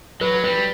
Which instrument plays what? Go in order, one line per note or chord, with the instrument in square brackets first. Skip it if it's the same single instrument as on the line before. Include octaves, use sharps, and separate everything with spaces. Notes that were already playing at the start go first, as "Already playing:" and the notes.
[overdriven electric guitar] F#3 [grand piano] B4
[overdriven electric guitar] G3 [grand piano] B4